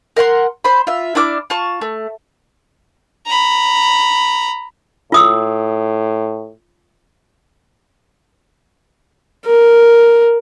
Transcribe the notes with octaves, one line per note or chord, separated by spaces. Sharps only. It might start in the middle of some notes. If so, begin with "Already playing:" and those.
A#4 E5 F#5 C6
C5 B5
F4 E5
D4 E4 D6 F6
F4 A5 C#6
A3
A#5 B5
A2 F4 D#6 E6
A#4